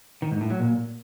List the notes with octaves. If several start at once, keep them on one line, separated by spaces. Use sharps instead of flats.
D#3
G#2
A2
F#3
A#2